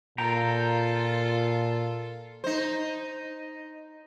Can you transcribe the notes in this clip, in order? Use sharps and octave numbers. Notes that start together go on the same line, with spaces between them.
A#2 F4 A4 G5 A#5
D#4 C5